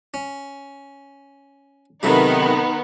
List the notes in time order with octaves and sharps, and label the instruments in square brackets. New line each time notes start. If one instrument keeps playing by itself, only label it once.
[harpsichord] C#4
[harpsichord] C3 F#3 A3 [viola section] D#3 B5 [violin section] B3 D#4